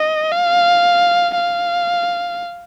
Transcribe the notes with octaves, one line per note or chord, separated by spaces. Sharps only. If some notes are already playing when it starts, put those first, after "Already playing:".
Already playing: D#5
F5
F5